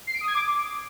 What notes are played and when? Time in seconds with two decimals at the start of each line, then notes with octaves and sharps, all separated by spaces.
0.07 C7
0.14 D7
0.21 D#6
0.28 G#6
0.35 D6